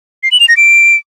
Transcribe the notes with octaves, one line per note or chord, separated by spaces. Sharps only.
C7
F#7
F7
A#6
D7